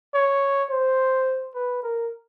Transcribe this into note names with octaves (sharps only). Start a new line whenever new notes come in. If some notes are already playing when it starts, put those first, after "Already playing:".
C#5
C5
B4
A#4